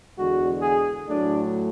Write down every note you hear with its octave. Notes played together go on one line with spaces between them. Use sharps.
E2 D3 G#3 F#4
G#4
A2 F#3 A3 D4